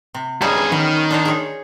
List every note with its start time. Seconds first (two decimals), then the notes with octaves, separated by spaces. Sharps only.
0.14 C3
0.41 G2 G3 C#4 D#4 G#4
0.55 E3
0.72 D#3 F#3 B3 C#4
1.11 D4 C5 D#5
1.25 G#4 C#5